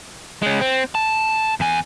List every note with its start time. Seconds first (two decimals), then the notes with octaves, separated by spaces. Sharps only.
0.42 G#3 C#4
0.61 C4
0.95 A5
1.60 E2 G#5